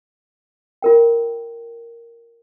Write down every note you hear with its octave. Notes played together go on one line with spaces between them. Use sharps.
F4 A#4 G5